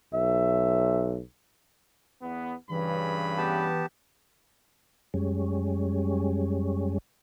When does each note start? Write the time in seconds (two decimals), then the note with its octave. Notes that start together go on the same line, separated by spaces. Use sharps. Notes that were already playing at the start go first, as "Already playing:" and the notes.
0.14 B1 E5
2.21 E2 B3
2.69 G2 C#3 E3 B5
3.38 B3 G4 A5
5.14 F#2 G3 G#3 C#4